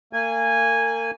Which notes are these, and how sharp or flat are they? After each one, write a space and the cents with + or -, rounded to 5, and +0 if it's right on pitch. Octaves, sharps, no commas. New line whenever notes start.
A#3 -35 G#5 -10